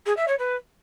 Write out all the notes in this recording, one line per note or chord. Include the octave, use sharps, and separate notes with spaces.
G#4
E5
C#5
B4